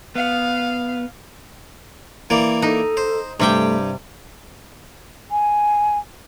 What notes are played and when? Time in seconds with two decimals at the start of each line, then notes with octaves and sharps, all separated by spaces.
0.15 B3 F5
2.30 E3 A#3 D5
2.62 D#4 A4
2.97 C5
3.40 G2 C3 G3 A3 G4 G5
5.31 G#5